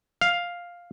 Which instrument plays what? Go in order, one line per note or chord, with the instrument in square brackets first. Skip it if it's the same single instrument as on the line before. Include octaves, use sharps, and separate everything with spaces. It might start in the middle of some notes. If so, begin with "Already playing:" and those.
[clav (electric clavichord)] F5